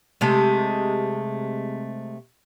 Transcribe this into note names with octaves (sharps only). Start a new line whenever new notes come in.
C3 G#3 A3